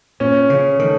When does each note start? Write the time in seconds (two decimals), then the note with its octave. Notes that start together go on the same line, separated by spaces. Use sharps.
0.20 A#2 C#4
0.49 C#3 C#4
0.79 D#3 A3